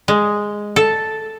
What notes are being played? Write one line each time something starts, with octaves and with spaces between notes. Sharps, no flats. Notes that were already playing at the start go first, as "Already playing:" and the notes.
G#3
A4